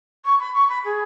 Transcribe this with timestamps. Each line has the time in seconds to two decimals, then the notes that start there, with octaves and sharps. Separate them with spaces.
0.25 C#6
0.40 B5
0.54 C#6
0.69 B5
0.84 G#4